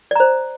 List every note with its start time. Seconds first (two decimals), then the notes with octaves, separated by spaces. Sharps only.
0.11 D5
0.16 A#5
0.20 C5